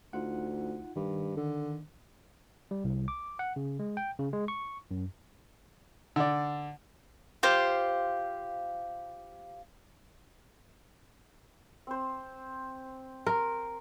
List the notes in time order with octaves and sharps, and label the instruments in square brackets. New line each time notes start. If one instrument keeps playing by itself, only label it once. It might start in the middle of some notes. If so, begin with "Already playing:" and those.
[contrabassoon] D2 [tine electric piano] D#4 F4 F#5
[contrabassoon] G2 [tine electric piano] D#3
[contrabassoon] D3
[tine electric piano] G3
C2
D6
F#5
C#3
G#3
G5
C#3
G#3
C#6
F#2
[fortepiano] D3 D5
[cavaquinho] F4 G4 C5 F5
[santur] C4 C5
[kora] A#4 [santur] C6